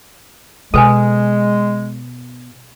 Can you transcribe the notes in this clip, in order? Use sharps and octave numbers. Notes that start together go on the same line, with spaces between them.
B2 G#3 A4 B4 G#5